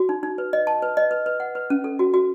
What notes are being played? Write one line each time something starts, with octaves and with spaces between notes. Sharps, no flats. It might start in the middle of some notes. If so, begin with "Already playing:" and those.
Already playing: F#4
D#4
D#4
B4
D#5
A5
B4
D#5
B4
B4
F#5
B4
C#4
A4
F#4
F#4